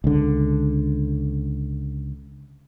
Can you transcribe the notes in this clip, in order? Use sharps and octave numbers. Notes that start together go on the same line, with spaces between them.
C#2 D3